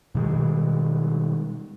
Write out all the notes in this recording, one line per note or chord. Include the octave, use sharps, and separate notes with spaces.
B2 D#3 G3 G#3